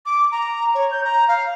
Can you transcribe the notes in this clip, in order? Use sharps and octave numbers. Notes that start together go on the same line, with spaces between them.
D6
A#5
C#5
G6
A#5
F5